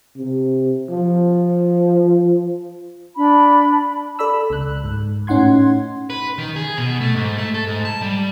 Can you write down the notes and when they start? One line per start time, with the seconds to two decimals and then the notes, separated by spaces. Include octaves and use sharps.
0.18 C3
0.89 F3
3.16 D4 B5
4.19 A4 D5 B5 E6
4.50 C#2 F#6
4.84 G#2
5.27 A2 C#4 D#4 F#5 C6 G#6
6.10 B4
6.38 D#3
6.56 G#4
6.77 B2
7.01 A3
7.15 G#2
7.38 A3
7.54 A4
7.67 G#2
7.85 A5
8.02 G3